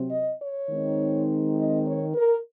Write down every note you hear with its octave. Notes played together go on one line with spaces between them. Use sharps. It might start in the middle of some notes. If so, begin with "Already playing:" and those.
Already playing: C3 F#3 C4
D#5
C#5
D#3 G#3 C4 D#4
D#5
C#5
A#4